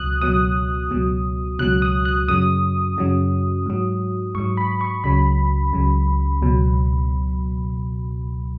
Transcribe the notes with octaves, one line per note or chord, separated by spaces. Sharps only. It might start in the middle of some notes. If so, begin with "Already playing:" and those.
Already playing: C#2 B2 F#3 D#6 F#6
C#2 B2 F#3 D#6
C#2 B2 F#3
C#2 B2 F#3 F#6
D#6
F#6
F#2 C#3 F#3 D#6
F#2 C#3 F#3
G#2 F#3
G#2 F#3 C#6
B5
C#6
C#2 C#3 F#3 B5
C#2 C#3 F#3
C#2 B2 F#3